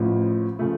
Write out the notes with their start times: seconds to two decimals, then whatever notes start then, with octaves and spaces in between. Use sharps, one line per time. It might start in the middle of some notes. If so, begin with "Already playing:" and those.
Already playing: A1 A2 F3
0.59 C#3 F3 A3